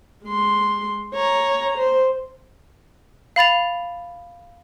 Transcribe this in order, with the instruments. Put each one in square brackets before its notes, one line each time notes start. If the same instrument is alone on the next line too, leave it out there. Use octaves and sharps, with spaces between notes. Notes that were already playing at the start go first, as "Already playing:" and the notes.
[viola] G#3 C6
C#5 A#5
C5
[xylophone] F5 B5 A6 F7